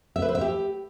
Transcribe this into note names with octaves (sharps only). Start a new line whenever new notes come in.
E5
B4
C5
E5
G4